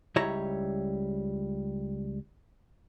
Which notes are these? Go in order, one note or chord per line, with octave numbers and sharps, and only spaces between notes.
C#2 G3 E4 C#5 A#5